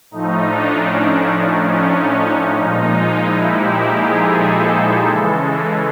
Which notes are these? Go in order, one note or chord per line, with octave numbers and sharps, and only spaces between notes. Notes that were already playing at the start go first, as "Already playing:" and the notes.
A2 F3 A3 D#4
D4
C#4
D4
D4
C#4
A#2 F3 G#3 D#4
E4
G4
G#4
A4
C#3 E3 G#3